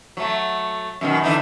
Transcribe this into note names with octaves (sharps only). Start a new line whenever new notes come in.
F#3 G3 A3
F#2 B2 D#3
D3 E3 D#4